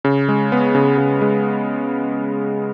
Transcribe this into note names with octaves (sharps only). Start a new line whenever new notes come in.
C#3
G#3
B3
C#3
C#3
G#3